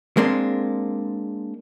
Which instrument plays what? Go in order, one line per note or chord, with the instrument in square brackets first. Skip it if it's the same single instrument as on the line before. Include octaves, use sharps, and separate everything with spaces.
[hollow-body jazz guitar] G#3 A#3 C4 D4